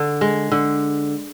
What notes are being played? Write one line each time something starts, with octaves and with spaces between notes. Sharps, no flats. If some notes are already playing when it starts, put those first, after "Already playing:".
Already playing: D3
G#3
D3